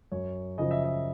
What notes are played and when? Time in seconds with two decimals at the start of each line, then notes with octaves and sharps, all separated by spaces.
0.12 F#2 C#5
0.58 C#3 F3 D#5
0.71 E5
0.84 D#5